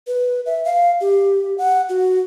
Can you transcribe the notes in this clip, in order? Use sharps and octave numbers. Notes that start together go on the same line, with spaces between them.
B4
E5
F5
G4
F#5
F#4